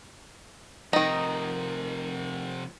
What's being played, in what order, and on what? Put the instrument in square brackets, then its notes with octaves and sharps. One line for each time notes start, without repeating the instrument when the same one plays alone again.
[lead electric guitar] C3 F3 [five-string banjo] D#3 D#4